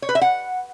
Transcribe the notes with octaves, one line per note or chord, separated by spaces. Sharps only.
C#5
B4
E5
F#5